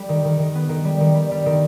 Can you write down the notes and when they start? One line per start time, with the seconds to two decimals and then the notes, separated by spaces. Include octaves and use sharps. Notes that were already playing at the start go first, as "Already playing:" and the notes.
Already playing: G3
0.09 D#3
0.25 D#3
0.39 D#3
0.55 B3
0.69 D#3
0.85 G3
1.00 D#3
1.15 G3
1.31 G3
1.46 D#3